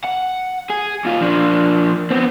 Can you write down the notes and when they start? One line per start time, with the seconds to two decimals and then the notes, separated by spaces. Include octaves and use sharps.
0.04 F#5
0.70 G#4
1.05 D#2 F4
1.21 F3 D4
2.11 B3 C4